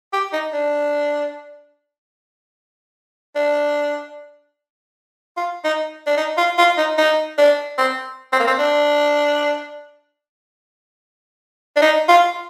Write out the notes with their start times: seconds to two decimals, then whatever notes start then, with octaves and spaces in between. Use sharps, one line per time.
0.13 G4
0.33 D#4
0.53 D4
3.36 D4
5.37 F4
5.64 D#4
6.07 D4
6.18 D#4
6.38 F4
6.58 F4
6.78 D#4
6.98 D#4
7.38 D4
7.78 C4
8.33 C4
8.40 A#3
8.48 C4
8.59 D4
11.76 D4
11.82 D#4
12.09 F4